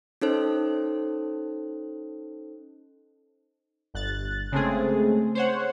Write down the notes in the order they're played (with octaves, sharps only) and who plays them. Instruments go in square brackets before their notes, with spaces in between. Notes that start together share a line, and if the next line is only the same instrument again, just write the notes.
[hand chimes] C#4 D#4 A4 C5
[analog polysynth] G1 F#6 A6
C#3 G#3 A3 C4 G#4
C5 C#5 F#5